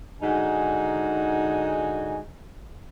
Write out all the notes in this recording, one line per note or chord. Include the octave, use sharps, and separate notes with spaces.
G#2 D3 D#4 F#4 F#5 G#5